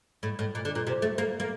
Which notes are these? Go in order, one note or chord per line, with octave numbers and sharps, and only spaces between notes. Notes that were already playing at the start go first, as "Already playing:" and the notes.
A2
A2
A#2
D3
A#2
C3
A3
A#3
A#3